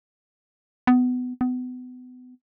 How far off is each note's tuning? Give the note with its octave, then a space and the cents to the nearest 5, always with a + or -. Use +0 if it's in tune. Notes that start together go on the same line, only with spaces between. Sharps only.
B3 +20
B3 +30